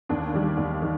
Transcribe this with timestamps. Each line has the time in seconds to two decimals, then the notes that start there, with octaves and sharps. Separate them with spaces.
0.09 D#2 D4
0.34 D#3 G3
0.57 D#2
0.82 D#3